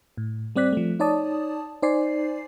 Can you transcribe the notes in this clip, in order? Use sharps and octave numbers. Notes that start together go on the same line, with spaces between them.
A2
G3 C4 D5 F#6 B6
F3 A3
D#4 C#5 D5 A5 D#6
D#4 C5 D5 G#5 C7